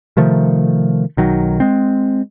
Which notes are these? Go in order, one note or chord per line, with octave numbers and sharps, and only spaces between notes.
C3 D#3 F3 A3
B1 D#3 F#3
G#3 C4